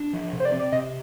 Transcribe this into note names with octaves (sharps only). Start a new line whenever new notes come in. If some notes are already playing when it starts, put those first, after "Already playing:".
Already playing: D4
F3
C3
C5
D5
C4
D5
C3 D#5